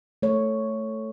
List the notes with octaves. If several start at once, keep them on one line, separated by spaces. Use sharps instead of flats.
A3 C#5